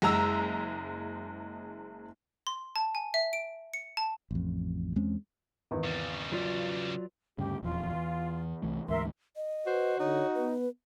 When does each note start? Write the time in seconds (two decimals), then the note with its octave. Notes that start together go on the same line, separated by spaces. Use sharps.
0.02 F#1 G#3 A#5 E6
2.47 C6
2.76 A5
2.95 G#5
3.14 E5
3.33 D7
3.74 C#7
3.97 A5
4.31 A1 F2
4.96 E2 G#3 C4 C#4
5.71 G#1 E2
5.84 C#3 G3
6.32 F#3 F4 D5
7.38 D2 G2 C#3 G4
7.63 D#1 E2 F3 F4
7.93 E2
8.63 C2 E3 A3
8.88 D2 G#2 E3 A#4 E5 C6
9.36 D#5
9.67 F#4 B4 C5
10.00 D3 D#4 C#5
10.35 B3 B4